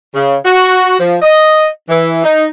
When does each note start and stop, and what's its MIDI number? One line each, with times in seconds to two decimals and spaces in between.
0.14 0.38 49
0.45 0.95 66
0.99 1.16 53
1.22 1.66 75
1.89 2.23 52
2.24 2.45 63